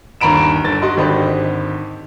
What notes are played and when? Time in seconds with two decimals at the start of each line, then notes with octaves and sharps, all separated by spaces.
0.21 G1 D#2 A#5 B5 D7 E7
0.64 G1 A6
0.82 F#4 D#5 C6
0.97 G#1 D3 C4 G4 D#5 B5